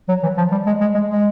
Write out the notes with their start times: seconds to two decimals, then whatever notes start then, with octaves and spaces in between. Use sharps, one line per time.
0.09 F#3
0.23 E3
0.37 F3
0.52 G3
0.67 G#3
0.81 G#3
0.94 G#3
1.09 G#3